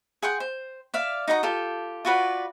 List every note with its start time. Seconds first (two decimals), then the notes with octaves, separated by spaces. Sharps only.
0.22 G#4 F#5 G5 C6
0.40 C5
0.94 D5 E5 F5
1.28 D#4 F#4 D#5 A#5
1.43 F4 G4 A4
2.05 F4 F#4 B4 D5